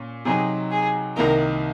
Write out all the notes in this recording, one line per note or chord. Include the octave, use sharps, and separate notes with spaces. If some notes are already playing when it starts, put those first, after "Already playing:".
Already playing: A#2 C#4
C3 F#3 C4 D#4 G#4
G#4
C2 C3 D#3 A#3 D#4 A#4